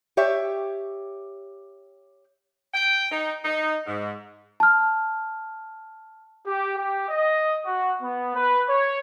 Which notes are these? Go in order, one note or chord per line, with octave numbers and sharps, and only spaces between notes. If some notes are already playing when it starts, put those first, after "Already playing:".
G4 C#5 E5
G5
D#4
D#4
G#2
A5 F6
G4
G4
D#5
F#4
B3
B4
C#5